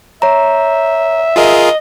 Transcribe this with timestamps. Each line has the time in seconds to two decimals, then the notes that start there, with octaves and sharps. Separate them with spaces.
0.22 C#5 E5 A#5
1.36 F4 G#4 A#4 D#5